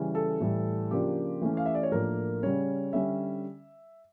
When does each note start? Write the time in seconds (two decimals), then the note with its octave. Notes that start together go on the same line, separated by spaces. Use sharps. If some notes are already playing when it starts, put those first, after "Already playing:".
Already playing: C#3 E3 G3 C#4
0.15 A4
0.40 A2 E3 G3
0.91 C#3 F3 A#3 D4 G4
1.41 E3 A3 C#4
1.57 F5
1.66 E5
1.75 D5
1.83 C#5
1.91 A2 F3 A#3 D4 A#4
2.43 C#3 G3 C#4 C#5
2.93 D3 G3 C#4 E5